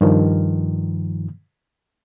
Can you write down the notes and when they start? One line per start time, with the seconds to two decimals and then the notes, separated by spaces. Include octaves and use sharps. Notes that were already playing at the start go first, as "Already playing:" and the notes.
0.01 G2 D#3 F3